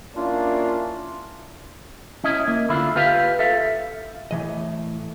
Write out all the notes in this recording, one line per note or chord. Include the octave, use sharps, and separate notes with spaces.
A#3 C#4 D4 E4 F4
C#4 E4 D#5
A#3
D3 E4 F4
F4 G4 B4 F5
A4 E5 F5
A2 E3 D#5